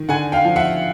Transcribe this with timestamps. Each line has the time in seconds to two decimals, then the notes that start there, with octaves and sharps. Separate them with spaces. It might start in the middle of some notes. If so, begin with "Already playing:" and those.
Already playing: D#3
0.08 D3 F#5 G#5
0.32 F5 G5
0.45 F3
0.56 E5 F#5